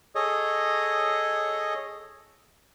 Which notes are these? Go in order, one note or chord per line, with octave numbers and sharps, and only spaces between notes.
G#4 A4 C#5 D#5